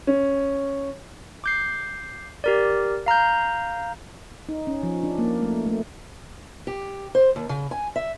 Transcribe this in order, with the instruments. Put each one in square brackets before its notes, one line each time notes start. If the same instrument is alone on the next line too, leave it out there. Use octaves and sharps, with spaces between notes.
[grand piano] C#4
[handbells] D6 G6 C7
G4 A#4 D5
F5 A#5 F6 G6
[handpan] D#4
C#4
F3
D4
A#3
A3
A3
[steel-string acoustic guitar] G4
C5
D#2
C#3
G#5
E5